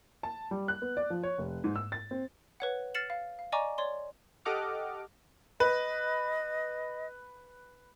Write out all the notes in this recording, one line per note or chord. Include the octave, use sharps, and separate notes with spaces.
A5
G3
F#6
B3
D5
F3
C#5
F1
G#2
E6
A6
C4
B4 C#5 F#5
F6 A6 C7 C#7 E7 F#7
F5
F5
D5 D#5 G#5 A#5 C#6 D6
C#5 D5 C6
G4 A4 D#5 F#5 D6 F6
B4 D#5